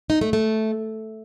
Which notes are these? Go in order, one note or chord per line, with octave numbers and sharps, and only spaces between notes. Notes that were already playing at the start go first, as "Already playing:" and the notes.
D#4
A3
A3